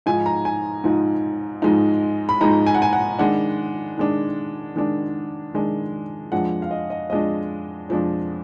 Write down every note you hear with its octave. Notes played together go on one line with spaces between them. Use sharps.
G#2 F3 G#3 D#4 G#5
A#5
G#5
G#2 F3 G#3 D#4
G#2 F3 G#3 D#4
B5
G#2 F3 G#3 D#4 A#5
G#5
F#5
G#5
F#5
D#3 G#3 D4 F#5
D#3 G#3 D4
D#3 G#3 D4
D#3 G#3 D4
F2 F3 G#3 D4 F#5
F5
D#5
D#5
F2 F3 G#3 D4 D#5
F2 F3 G#3 D4